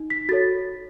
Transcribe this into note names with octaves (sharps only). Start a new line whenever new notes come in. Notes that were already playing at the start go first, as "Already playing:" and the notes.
Already playing: D#4
B6
F#4 A4 C#5 A6